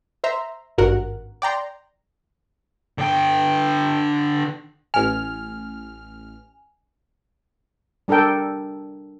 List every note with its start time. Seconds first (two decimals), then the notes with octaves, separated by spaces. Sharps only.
0.24 C5 E5 A#5 C6
0.78 G#1 G2 F#4 A#4 F#5 F#6
1.42 D5 G5 A#5 C6
2.98 D3 G5
4.94 A1 G#5 F6
8.08 G3 D4 A4 A#4 G5